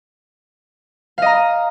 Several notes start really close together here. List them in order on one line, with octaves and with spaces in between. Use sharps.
F5 D#5 A#5